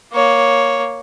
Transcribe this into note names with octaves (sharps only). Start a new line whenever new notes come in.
A#3 C#5